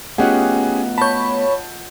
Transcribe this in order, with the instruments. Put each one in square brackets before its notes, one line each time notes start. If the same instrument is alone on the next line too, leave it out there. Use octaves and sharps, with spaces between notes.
[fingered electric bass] A3 B3 [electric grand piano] C#4 G4 G#4 [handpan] F4 D#5 F#5
[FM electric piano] C#5 B5 [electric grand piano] A5 G6